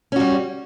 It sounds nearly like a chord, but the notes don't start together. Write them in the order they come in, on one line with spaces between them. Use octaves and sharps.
C#4 F#4 G3